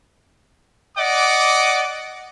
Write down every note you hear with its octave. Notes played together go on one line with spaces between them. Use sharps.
D5 D#5 F#5 D6